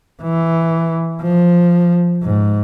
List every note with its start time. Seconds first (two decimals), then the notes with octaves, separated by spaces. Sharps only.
0.22 E3
1.22 F3
2.23 G#2